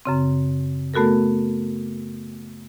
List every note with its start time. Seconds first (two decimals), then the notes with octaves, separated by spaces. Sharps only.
0.05 F#2 C#3 C4
0.94 A3 B3 F#4 A4 A#4